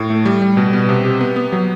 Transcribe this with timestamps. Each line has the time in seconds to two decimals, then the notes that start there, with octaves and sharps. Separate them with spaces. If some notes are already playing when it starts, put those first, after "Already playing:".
Already playing: A2
0.10 A3
0.25 G3
0.42 G3
0.57 B2
0.73 B3
0.89 C3
1.05 G4
1.21 B3
1.36 B3
1.52 F#3